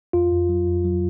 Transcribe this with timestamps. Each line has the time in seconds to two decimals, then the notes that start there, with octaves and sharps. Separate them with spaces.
0.13 F2 F4
0.31 F2
0.49 F#3
0.67 F2
0.85 F#3